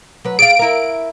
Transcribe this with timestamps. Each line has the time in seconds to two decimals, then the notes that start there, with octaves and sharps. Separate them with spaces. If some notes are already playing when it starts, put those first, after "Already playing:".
0.25 F#3 B4
0.39 G#4 D5 F5 D7
0.59 E4 A#4